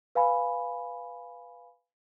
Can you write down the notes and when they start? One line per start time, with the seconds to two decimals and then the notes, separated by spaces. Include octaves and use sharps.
0.15 B4 F5 G#5 B5